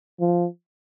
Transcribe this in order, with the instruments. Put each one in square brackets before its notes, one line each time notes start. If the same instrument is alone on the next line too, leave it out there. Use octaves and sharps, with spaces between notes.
[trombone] F3